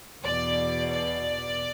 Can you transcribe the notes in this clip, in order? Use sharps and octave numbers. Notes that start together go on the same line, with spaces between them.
E2 B2 D5
D5